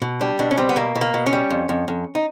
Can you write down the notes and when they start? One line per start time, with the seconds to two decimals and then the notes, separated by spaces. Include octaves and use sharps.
0.02 B2
0.21 G3 D4
0.39 B2 D4
0.51 C#4
0.57 G3 C4
0.69 B3
0.76 B2 A#3
0.95 B2
1.01 A#3
1.14 B2
1.26 C#4
1.33 G3
1.50 F2
1.69 F2
1.88 F2
2.15 D#4